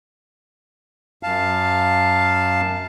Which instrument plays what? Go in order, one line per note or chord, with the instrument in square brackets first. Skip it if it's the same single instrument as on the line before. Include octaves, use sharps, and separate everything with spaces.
[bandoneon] F#2 F5 A5